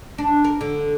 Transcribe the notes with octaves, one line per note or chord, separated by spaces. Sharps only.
D4
A#4
D3